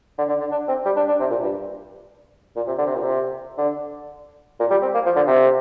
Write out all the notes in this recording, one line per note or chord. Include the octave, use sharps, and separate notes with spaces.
D3
D3
D3
D4
C4
G3
D4
D4
C3
A#2
G2
A#2
C3
D3
C3
A#2
C3
D3
A#2
G3
C4
A#3
F3
D3
C3